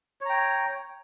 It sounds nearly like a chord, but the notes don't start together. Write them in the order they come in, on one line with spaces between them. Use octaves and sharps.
C#5 A#5 G5